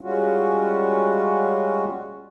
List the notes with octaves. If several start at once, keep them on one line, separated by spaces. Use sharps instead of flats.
G3 G#3 C#4 F4 F#4